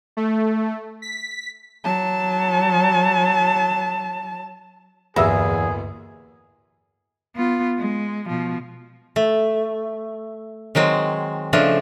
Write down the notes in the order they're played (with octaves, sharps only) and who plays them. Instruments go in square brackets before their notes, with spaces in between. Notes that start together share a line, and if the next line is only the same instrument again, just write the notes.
[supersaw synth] A3
B6
[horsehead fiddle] F#3 A5
[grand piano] D1 A#3 B3 [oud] E2 [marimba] G2 E5 E6 [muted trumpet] G#4
[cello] B3 F4
G#3
B2 F3
[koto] A3
D#3 F#3 G#3 C4
C#3 F3 A3 D4 D#4